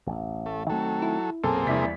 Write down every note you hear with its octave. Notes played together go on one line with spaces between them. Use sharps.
E1 A1
A3
D#3 F#3 A3 C4 A4
E4
B1 F#2 A#2 A#3 C4 G#4 A4
A#1 E2 C3 G3 E4 B6